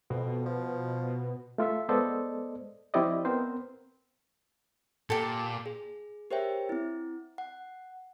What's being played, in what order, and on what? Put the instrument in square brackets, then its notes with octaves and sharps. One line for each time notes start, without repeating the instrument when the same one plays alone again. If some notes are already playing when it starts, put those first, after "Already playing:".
[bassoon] F2 [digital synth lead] B2
[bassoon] F3
[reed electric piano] A3 F4 A4 E5
G#3 B3 A4 C5 D5 D#5
F3 C4 E4 G4 D5 D#5
B3 C4 A#4 C5
[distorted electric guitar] A#2 [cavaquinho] G4 A4
[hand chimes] G#4
G4 A#4 C5 C#5 E5 G5
C4 E4
F#5